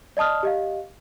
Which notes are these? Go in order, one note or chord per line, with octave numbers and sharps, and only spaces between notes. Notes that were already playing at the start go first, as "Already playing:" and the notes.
D5 D#5 A5 D#6 F6
G4 D#5 F5